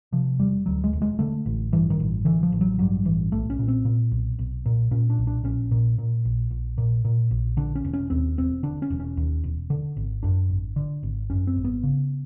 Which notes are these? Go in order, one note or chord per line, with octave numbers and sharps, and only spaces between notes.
C3 F3
E1 G3
D2 F#3
G#3
E1
G#3
D3 A3
A1
G2 E3
D#3
A1
D3 E3
F3
A1
F#3
G2 F#3
A1 E3
B1 A3
C#4
A#2
C4
A#2
B1
B1
A#2
A#2 C#4
D4
B1
D4
A#1 C#4
A#2
A#2
A#1
A#1
A#2
A#2
A#1
D3 D4
C#4
E1
C#4
D#2 C4
E1 C4
D3 D4
C#4
E1
C#4
D#2
E1
D3
G#1
F#2 D4
G#1
D3
G#1
F#2 C#4
C4
G#1
B3
C#3